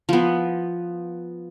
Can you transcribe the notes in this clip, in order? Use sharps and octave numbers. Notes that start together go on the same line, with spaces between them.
F3 B3